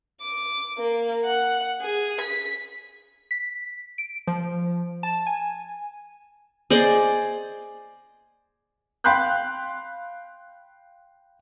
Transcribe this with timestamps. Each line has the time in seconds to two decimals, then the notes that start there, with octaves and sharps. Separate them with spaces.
0.22 D6
0.79 A#3
1.25 F#5
1.81 G#4
2.21 B6
3.31 B6
3.98 D7
4.27 F3
5.03 A5
5.27 G#5
6.70 G#4 C5 D5 D#5
9.04 F5 G5 B5 C6 F#6 G6